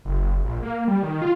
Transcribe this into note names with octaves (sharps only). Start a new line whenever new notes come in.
F#1
A#1
A#3
G3
D#3
F4